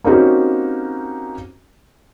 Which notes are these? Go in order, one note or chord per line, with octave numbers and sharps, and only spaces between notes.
A#3 C4 C#4 D#4 F#4 G4